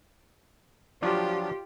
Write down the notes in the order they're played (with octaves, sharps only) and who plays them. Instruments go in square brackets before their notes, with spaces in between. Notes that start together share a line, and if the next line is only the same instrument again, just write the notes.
[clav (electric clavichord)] F3 F#3 D4 [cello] F4 G4